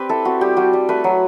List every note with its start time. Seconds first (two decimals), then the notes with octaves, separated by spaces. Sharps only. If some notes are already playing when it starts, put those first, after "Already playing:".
Already playing: C4 G4 B4 D5
0.09 E4 A4
0.25 C4 F#4
0.41 G3 G4
0.57 G3 F#4
0.73 G3
0.89 A3 B4
1.04 F#3